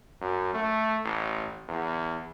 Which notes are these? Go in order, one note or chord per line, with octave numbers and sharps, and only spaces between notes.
F#2
A3
A1
E2